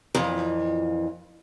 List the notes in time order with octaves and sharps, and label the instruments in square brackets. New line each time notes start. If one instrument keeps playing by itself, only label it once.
[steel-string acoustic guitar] F2 A#2 E3